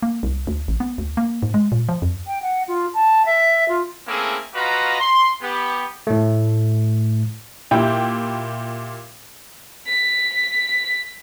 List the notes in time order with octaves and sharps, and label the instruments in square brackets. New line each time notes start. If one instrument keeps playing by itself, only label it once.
[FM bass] A#3
C2
D2
A1
B3
D2
A#3
G#2
G#3
A#2
F3
F2
[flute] G5
F#5
F4
A5
E5
F4
[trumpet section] A3 A#3 C4 C#4 E4 G#4
F4 F#4 B4 D#5 F5 A#5
C6
B3 G4
[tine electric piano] A2 A3
[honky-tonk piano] A#2 E4 G4 G5
[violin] B6